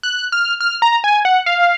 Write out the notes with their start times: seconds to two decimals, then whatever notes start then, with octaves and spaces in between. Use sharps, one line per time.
0.03 F#6
0.32 F6
0.60 F6
0.82 A#5
1.04 G#5
1.25 F#5
1.46 F5